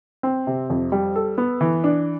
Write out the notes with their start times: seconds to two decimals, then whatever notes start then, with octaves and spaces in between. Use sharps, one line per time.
0.23 C4
0.47 C3
0.70 F2
0.92 G3
1.16 A4
1.38 B3
1.61 E3
1.84 D4